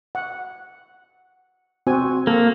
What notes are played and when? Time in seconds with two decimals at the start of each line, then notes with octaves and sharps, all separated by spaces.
0.15 F#5
1.87 C4 F#4 G#5
2.27 A#3 A4